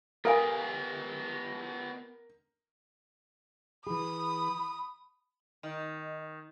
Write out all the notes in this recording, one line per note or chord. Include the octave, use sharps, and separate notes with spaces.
B3 G4 A4 A#4 F5 G#5
E3 G#4 B5 D#6
D#3 D#5